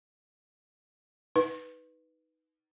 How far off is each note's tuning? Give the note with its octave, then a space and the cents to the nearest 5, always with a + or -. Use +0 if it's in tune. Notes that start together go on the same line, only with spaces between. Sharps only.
D#4 +20 B4 +0